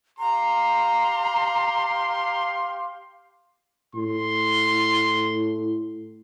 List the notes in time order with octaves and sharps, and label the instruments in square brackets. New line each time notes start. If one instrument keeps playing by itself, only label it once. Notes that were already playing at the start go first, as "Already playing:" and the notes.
[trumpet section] G4 F5 C6 [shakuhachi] A#5
[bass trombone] A2 [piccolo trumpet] C6